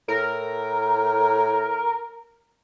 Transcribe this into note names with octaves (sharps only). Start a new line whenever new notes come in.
A2 A#4